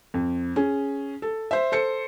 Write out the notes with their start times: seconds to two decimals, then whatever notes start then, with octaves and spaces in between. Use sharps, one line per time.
0.14 F2
0.56 C#4 G#4
1.22 A4
1.51 C5 E5
1.72 A4 C5 C#7